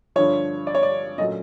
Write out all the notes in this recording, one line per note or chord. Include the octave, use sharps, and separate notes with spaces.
G2 D3 F3 C#5
D5
C#5
D5
A#2 F#3 A3 C#4 D#5